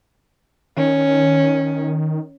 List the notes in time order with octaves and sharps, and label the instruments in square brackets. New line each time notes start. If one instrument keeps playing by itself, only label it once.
[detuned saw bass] D#3 [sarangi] C#4